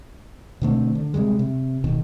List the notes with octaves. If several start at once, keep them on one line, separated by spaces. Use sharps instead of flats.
B2 D3 A3 C4
D3
C3 D#3 G3 G#3
C3
D1 B2 D#3